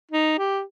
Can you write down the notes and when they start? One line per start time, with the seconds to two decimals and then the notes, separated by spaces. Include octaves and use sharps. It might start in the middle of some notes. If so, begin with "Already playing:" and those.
0.11 D#4
0.38 G4